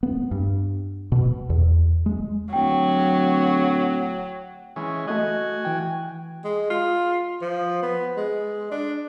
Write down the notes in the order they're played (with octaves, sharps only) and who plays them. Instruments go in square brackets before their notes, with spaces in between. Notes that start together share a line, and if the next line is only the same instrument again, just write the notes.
[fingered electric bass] B3
G2
B2
E2
G#3
[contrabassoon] D1 [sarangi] F#3 [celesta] G5
[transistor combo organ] E3 G#3 C#4
[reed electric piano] A3 D#5 [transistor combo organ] F#4 G#5
[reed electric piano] E3 G5
[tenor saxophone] G#3
F4
F3
B3
G#3
D4